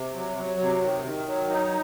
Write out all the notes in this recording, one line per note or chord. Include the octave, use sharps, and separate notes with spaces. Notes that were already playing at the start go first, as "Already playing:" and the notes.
Already playing: C3
F#3
F#3
C3
D#3
D#3
F#3
D#4